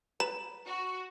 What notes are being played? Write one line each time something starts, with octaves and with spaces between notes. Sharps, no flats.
B4 A#5 E7
F#4